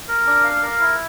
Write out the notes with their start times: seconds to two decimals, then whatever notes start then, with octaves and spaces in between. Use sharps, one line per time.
0.08 A#4
0.27 D4
0.44 F5
0.63 A#4
0.80 E4